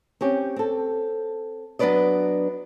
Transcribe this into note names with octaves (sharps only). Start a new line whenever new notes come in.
C4 C#4 G4
C4 A4
F#3 B3 D4 B4 D5 D#5